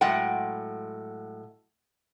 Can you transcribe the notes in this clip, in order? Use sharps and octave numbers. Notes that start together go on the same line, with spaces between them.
A2 F#3 G#3 F#5 G5